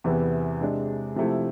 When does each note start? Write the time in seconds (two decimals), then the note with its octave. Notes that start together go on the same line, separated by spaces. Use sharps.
0.04 E2 C3 E3 B3 E4
0.61 C3 G#3 D4
1.16 C3 F3 A3 E4